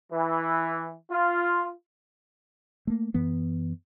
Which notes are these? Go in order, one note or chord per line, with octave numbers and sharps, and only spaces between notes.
E3
F4
A3 A#3
F#2 E3 B3